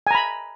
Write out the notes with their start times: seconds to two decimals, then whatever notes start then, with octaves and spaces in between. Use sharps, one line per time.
0.07 G#5
0.11 A#5
0.15 B5